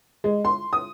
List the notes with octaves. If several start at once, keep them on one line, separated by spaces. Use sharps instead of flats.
G#3
C6
D#6